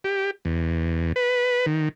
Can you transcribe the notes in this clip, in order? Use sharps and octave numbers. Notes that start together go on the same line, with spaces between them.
G4
E2
B4
D#3